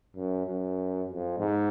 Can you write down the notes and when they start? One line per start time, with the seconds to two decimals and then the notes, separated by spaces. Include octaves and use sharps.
0.16 F#2
0.46 F#2
1.09 F2
1.38 G#2